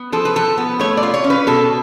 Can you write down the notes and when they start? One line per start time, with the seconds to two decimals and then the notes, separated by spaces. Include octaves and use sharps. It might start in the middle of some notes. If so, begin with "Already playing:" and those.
Already playing: B3
0.12 F3 A4
0.25 B4
0.35 F3 A4
0.58 B3
0.79 A3 C#5
0.97 D5
1.03 F4
1.14 C#5
1.24 C#4
1.30 B4
1.47 B2 A4